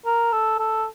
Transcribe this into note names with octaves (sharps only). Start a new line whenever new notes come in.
A#4
A4
A4